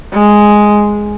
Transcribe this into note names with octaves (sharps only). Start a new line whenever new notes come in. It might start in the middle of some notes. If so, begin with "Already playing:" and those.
G#3